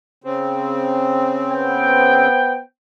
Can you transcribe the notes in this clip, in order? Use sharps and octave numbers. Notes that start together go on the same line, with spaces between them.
C#3 C4
B3 C5 G5